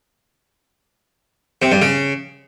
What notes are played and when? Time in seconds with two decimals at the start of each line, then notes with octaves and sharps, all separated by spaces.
1.62 C3
1.72 G2
1.82 C#3